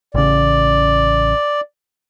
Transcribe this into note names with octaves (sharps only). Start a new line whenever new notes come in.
A1 C#3 D5